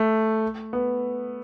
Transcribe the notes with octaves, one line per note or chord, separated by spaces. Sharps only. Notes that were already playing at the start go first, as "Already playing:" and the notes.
Already playing: A3
B3